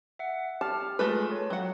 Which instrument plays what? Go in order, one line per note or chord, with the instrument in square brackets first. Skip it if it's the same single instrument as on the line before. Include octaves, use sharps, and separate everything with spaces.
[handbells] E5 F#5
[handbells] G4 F6 [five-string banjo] A5
[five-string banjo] G#3 A3 B4 [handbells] F4 A5
[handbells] C#5
[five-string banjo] F#3 F#5